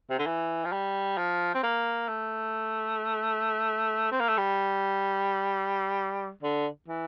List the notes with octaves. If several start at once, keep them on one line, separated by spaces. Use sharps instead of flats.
C3
D3
E3
F3
G3
F3
C4
A#3
A3
C4
A#3
A3
G3
D3
E3